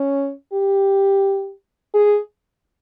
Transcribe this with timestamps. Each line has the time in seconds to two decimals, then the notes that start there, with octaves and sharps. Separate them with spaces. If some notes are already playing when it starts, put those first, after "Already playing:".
Already playing: C#4
0.53 G4
1.94 G#4